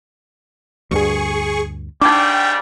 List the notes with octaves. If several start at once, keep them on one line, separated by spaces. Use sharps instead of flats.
D2 G2 D3 G#4 C#6
G#2 C#3 G3 D4 D#4 G5 D6